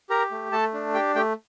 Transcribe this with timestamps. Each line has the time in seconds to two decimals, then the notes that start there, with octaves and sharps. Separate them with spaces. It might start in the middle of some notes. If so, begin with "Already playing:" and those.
0.10 G4 A#4 A#5
0.31 A3
0.52 A3 A4 A5
0.74 D4
0.94 G4 G5
1.15 A3 G4 G5